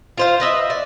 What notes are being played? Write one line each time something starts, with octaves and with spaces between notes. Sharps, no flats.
F4 C5 F5
B4 D#5 E5
D5